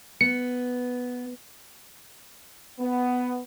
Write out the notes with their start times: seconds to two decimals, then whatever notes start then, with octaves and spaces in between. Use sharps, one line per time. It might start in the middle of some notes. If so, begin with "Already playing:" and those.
0.21 B3 C#7
2.79 B3